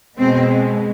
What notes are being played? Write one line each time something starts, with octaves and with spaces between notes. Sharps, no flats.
B2 G#3 C4